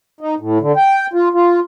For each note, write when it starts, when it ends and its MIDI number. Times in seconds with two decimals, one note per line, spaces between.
0.21 0.35 63
0.40 0.58 45
0.61 0.72 50
0.76 1.07 79
1.13 1.29 65
1.34 1.60 65